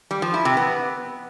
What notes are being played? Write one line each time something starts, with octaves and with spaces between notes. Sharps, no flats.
G3
F3
E4
C3
B3